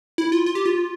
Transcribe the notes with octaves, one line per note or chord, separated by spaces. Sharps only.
E4
F4
F4
G4
F4